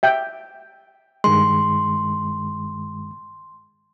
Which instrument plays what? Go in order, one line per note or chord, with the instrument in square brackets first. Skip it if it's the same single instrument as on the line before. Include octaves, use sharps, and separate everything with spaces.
[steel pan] E5 G5
[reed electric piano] G2 D#3 G#3 [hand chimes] C6